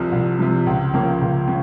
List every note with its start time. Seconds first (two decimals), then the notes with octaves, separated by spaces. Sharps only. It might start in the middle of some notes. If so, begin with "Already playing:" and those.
Already playing: C2 C3 F3
0.12 C2
0.39 C3 F3
0.66 C#2
0.94 C#3 F3 A#3
1.21 C#2
1.48 C#3